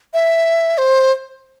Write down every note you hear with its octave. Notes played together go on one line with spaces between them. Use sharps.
E5
C5